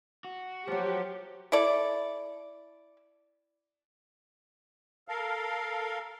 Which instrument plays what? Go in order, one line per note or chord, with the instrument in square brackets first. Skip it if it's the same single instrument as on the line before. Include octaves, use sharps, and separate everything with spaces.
[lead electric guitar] F#4
[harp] F3 F#3 [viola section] G4
[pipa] E4 A4 D5
[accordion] A4 A#4 F5